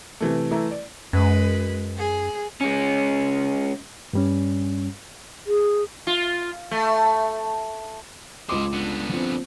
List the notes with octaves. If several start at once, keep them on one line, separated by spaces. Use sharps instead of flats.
C3 E3 A3
E3 A3 E4 A#5
D5
F#2 G#3 B4
G#4
G#3 C#4
G2 G3 C#4
G#4
F4
A3
C#2 C5 D#5 D6
D3 B3
F3 C4